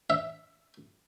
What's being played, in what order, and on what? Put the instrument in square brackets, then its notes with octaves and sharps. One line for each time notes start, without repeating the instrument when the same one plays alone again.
[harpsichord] E5